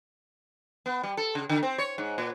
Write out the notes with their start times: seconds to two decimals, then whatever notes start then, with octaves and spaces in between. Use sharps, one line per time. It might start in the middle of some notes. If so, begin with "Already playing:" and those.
0.86 B3
1.03 G3
1.17 A4
1.35 C#3
1.49 D3
1.63 C4
1.78 C#5
1.98 G#2
2.18 A#2